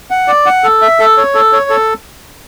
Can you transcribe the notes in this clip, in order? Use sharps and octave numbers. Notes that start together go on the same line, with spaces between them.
F#5
D5
F#5
A4
E5
A4
C#5
A4
C#5
A4